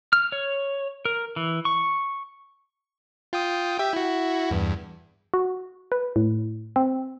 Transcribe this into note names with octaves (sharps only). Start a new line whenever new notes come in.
F6
C#5
A#4
E3
C#6
F4 G5 D#6
G4 E5 G5
E4 F#4
E2 G2
F#4
B4
A2
C4